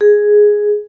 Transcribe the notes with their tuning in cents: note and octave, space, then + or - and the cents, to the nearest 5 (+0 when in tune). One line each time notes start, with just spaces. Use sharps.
G#4 +0